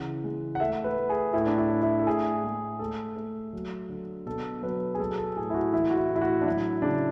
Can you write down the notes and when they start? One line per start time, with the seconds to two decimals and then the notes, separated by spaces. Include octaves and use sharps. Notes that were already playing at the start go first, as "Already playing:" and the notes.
Already playing: C#3 E3 F#5
0.24 G#3
0.55 F#5
0.60 A3 E5
0.84 B4
0.97 A3
1.09 G#4
1.33 A2 E4
1.46 D4
1.58 E4
1.70 A2
1.82 E4
1.99 A4
2.06 A2 G#4
2.44 G#3
2.79 A3 A4
3.16 A3
3.53 F#3
3.89 D3
4.26 B2 A4
4.62 F#3 B4
4.94 G#4
4.99 G#3 A4
5.10 G#4
5.18 A4
5.36 A2 G#4
5.50 E4
5.54 F#4
5.72 E3 E4
5.90 F#4
5.97 E4
6.09 A2
6.15 E4
6.21 F#4
6.41 D4
6.45 F#3 E4
6.82 C#3 D4